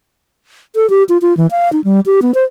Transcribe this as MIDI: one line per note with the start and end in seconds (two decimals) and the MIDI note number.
0.76 0.89 69
0.90 1.03 67
1.09 1.18 65
1.22 1.36 65
1.37 1.47 52
1.51 1.71 77
1.73 1.81 63
1.84 2.00 55
2.06 2.20 67
2.22 2.34 59
2.34 2.44 72